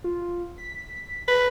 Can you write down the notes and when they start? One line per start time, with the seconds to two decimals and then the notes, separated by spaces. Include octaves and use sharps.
0.04 F4
0.58 B6
1.28 B4